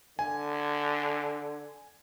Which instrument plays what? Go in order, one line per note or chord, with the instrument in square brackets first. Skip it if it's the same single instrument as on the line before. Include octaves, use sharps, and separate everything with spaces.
[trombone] D3 [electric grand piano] G#5